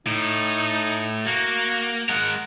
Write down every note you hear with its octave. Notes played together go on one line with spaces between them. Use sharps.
A2 D#4
A#3 F#4
G#3 A#4 F#5